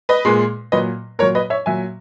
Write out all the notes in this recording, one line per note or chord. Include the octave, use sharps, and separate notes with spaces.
B4 D#5
A#2 G#3
A#2 F#3 B4 D#5
A#2 F#3 A#4 C#5
B4 D#5
C#5 E5
A#2 F#3 E5 G#5